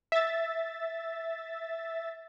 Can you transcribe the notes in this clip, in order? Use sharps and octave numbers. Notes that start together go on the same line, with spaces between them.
E5 A6